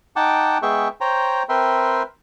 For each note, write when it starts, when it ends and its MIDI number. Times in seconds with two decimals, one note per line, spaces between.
0.16 0.58 63
0.16 0.58 78
0.16 0.58 79
0.16 0.58 81
0.16 0.58 86
0.62 0.88 56
0.62 0.88 59
0.62 0.88 68
0.62 0.88 76
0.62 0.88 79
0.62 0.88 85
1.01 1.43 72
1.01 1.43 73
1.01 1.43 79
1.01 1.43 82
1.49 2.02 60
1.49 2.02 70
1.49 2.02 71
1.49 2.02 76
1.49 2.02 79
1.49 2.02 84